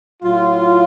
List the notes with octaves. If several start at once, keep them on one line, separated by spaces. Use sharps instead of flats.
A2 F#3 F4